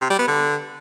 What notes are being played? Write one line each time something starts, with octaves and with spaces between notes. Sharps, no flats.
C3
G3
B3
D3